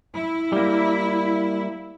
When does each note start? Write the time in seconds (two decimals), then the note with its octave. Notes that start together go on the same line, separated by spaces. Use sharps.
0.14 E4
0.53 G3 A#3